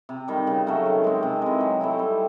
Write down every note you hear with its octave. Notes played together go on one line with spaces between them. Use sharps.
C3
D#3 G3
C#3
F#3 A3 C#4
D#3
G#3 C4
C3
E3 G#3
F#3
A3 C4 E4
G3